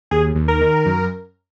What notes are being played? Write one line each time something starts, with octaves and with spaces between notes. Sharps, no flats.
D#2 G#4
D#2
A#4
D#3
F#2